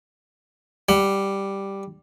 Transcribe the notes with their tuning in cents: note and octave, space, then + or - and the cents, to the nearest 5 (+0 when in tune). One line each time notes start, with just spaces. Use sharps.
G3 +0 F#5 +25